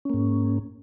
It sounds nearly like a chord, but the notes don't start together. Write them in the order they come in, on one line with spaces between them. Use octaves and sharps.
C#4 A#3 G#2